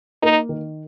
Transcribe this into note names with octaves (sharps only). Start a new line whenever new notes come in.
A#3 D#4
D#3